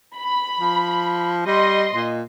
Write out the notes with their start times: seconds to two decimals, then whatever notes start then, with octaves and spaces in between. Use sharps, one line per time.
0.16 B5
0.60 F3
1.46 G3 D#5 C6
1.94 A#2